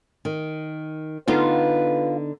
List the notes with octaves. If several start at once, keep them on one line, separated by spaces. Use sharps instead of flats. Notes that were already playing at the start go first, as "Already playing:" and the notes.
D#3
D3 B3 D#4 F4 B4